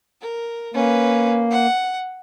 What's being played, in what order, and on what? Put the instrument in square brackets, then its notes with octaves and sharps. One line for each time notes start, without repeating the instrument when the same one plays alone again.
[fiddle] A#4
[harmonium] A#3 [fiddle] C#4 B4
[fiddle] F#5